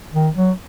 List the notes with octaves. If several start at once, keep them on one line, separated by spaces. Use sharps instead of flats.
D#3
F#3